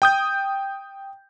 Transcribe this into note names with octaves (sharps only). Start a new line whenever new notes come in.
G5 D#6 G6